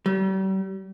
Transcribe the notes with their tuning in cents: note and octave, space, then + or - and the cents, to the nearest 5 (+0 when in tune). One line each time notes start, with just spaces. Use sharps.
G3 -40